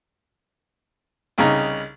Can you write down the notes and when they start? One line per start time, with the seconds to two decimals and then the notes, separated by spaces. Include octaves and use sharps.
1.38 C2 C#3 D#4 A#5